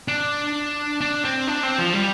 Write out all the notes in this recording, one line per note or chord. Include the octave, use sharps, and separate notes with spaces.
D4
D4
C4
D4
C4
F3
G3